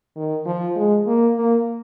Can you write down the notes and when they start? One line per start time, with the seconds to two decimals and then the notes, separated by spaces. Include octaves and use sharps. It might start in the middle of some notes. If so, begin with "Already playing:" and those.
0.16 D#3
0.46 F3
0.76 G#3
1.07 A#3
1.37 A#3